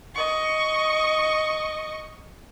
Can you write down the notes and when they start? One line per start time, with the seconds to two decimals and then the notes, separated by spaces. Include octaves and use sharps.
0.15 D#5 C#6